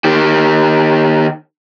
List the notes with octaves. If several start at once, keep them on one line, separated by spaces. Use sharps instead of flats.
D#3 G4